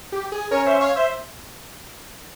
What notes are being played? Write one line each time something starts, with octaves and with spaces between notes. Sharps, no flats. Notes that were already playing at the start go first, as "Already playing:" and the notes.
G4
G#4
C#4 A#4 C#5
C5 E5
C#5 F5
C5 E5